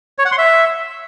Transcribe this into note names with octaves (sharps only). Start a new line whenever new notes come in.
C#5
F#5
C6
E5